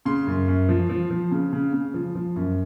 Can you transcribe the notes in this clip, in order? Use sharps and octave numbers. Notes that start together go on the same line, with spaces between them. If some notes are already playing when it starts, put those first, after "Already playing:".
C#3 C6
F#2
F#2
F3
F3
F3
C#3
C#3
C#3
F3
F3
F#2